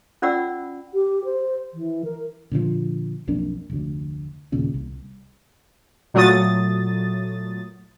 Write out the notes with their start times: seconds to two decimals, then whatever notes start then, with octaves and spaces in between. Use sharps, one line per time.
0.22 C#4 F4 D5 F#5 E6
0.94 G4
1.25 C5
1.74 E3
2.04 A#4
2.51 A#2 D3 D#3 F3
3.27 B1 F2 A#3 D4
3.70 F1 D2
4.52 D#2 A#2 C#3
4.74 C2
6.14 A#2 F#3 A3 D#6 A6